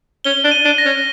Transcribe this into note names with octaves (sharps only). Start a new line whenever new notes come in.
C#4 G7
D4
D#7
D4
A#6
C#4